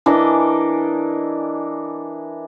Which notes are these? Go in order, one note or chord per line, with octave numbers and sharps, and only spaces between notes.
E3 D4 A#4 D#5